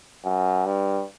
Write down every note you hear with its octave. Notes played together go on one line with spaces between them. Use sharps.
F#2
G2